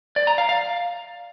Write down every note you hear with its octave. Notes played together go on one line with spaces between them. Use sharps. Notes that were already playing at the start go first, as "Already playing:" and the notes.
D5
A#5
F5
F5